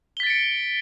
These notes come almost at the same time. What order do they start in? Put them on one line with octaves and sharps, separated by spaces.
G7 B6 A6 D7 C#7